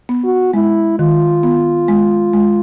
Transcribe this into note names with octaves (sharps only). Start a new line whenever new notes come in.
B3
F#4
G#3 E4
D#3 F4
B3
G#3
G#3